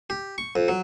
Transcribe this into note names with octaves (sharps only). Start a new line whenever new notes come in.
G4
C#6
F2
F#3